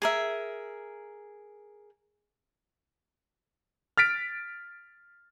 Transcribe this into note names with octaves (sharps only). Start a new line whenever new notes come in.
G#4 A#4 E5
F6 A6 B6 D7